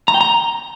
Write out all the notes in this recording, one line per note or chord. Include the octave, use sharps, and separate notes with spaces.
A#5
G5
A#5